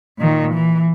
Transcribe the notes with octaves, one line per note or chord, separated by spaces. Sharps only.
A#2 D#3
E3